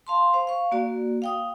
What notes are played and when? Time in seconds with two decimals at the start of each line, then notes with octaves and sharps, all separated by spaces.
0.07 F5 A5 C6
0.33 C5 F5
0.47 F5 C#6
0.72 A#3 F#4 D5
1.22 F5 G5 D#6